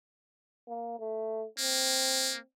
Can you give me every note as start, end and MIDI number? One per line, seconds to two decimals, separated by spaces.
0.68 0.96 58
0.98 1.45 57
1.58 2.37 58
1.58 2.43 60